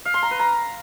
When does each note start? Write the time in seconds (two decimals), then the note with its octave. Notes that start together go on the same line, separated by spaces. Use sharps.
0.05 F5
0.14 C6
0.22 A#5
0.31 B4
0.40 A#5